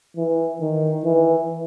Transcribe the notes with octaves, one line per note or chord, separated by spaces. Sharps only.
E3
D#3
E3